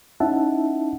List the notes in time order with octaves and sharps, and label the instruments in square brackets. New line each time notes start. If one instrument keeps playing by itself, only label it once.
[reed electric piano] C#4 D#4 E4 E5 F#5 A5